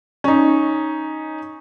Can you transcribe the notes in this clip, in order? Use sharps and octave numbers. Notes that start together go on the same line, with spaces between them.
C#4 D#4